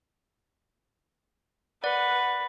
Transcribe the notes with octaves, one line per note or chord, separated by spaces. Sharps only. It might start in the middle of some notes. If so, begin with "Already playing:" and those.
B4 D5 F#5